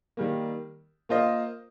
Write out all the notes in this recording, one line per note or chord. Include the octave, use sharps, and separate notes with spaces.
D#3 G3 A#3
A#3 F4 C5 D#5